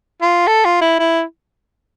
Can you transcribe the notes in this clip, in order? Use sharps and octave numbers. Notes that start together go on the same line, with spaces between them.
F4
A4
F4
E4
E4